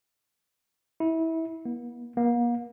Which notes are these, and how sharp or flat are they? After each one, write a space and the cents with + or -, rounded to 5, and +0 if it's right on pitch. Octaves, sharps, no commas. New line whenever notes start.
E4 -25
B3 -45
A#3 +40